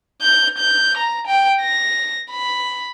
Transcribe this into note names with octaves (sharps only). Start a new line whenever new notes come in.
G6
G6
A#5
G5
A#6
B5